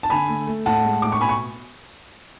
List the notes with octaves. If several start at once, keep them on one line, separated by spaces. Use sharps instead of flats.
A5
D3 G#5 B5
A3
A3
A2 F#5 A5
G#3
A2 D6
C#6
B2 G#5 B5
C#6